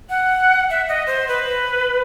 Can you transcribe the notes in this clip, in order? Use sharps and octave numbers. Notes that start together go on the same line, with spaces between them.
F#5
E5
D#5
C5
B4